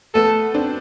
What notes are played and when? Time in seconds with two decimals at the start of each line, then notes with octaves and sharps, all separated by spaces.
0.14 A3 B3 A4
0.54 C4 D4